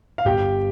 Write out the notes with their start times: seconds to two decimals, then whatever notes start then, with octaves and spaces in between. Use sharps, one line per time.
0.18 F5
0.25 G1 G4 G5